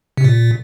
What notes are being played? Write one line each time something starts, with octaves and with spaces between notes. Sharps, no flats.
C3
A#2